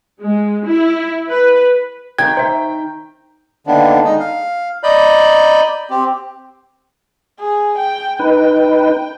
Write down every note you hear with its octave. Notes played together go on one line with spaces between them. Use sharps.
G#3
E4
B4
D#3 G5 G#6
C5 E5
D3 D#3 A#3 B3 D4
G#3 D#4
F5
D5 D#5 A#5 B5 G6
C4 G4
G#4
G5
D#4 B4 G5